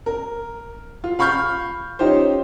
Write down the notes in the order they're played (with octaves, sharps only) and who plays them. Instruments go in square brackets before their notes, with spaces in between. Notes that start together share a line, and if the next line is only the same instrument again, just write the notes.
[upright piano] A#4
F4
F5 B5 C#6 F6 G6
C#4 D#4 F4 G4 C5